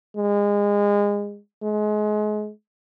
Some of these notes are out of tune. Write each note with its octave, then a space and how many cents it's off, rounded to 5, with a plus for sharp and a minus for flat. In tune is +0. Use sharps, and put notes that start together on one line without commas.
G#3 -25
G#3 +30